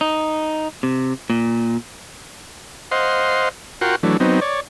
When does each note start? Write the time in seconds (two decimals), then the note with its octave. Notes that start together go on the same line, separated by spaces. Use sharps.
0.01 D#4
0.83 C3
1.30 A#2
2.91 C5 D#5 F5 F#5 C6
3.81 F4 F#4 A#4 F#5 G5 C6
4.03 E3 F#3 A3 D4
4.20 F#3 B3 C4 D#4
4.41 C#5 D5